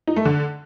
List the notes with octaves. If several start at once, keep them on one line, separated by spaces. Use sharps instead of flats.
D#4
A3
D3